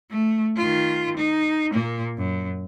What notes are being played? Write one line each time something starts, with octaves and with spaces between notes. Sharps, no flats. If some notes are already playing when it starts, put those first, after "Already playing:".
A3
D#3 F4
D#4
A#2 A#3
F#2